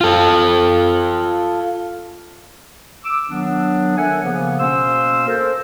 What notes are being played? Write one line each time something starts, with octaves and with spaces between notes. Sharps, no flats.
F4 A4
D6 E6
D#3 F#3 B3 D4
A4 A#4 E5 F#5 G#5
C#3 F3 A#3 B3
B2 A#3 C#4 C5 C6 E6
A4 A#4 C5